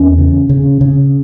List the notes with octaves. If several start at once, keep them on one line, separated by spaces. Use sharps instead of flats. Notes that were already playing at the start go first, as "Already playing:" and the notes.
Already playing: E2 C#4
C#3
C#3
C#3